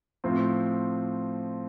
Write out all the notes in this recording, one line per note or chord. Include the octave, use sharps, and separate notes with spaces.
A2 F3 C4